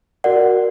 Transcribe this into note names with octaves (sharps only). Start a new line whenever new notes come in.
F#4 A#4 D5 F#5